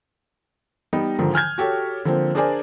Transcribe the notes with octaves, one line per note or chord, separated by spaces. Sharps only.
G3 B3 D#4
G#2 D3 D#3 F3
G#5 F6 G6 G#6
F#4 G4 A4 C#5
D3 F3 A#3 C4
D4 G#4 A#4 C5 D5 G#5